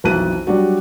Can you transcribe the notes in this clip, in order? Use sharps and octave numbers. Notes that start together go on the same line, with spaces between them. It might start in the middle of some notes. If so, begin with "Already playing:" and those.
B1 F2 E3 A5 F#6 D#7
F#3 G3 D4 F#4